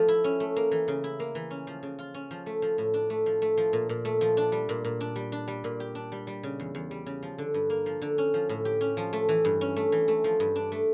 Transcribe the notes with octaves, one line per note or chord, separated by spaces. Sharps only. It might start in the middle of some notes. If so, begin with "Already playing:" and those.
Already playing: F3 A3
E4
C#4
A3
A#3
E3
C#3
E4
A#3
E3
C#4
F3
C#3
F4
C#4
F3
A3
F3
A2
D4
A3
F3
A3
F3
A#2
A#2
A3
F3
D4
G3
A#2
A#2
D4
G3
D4
G3
A#2
G4
D4
G3
G3
C#3
E2
E2
G3
C#3
F3
D3
G2
A#3
F3
D3
C#4
F3
A2
G4
C#4
F3
A3
E3
G2
C#4
A3
E3
A3
F3
G2
D4
A3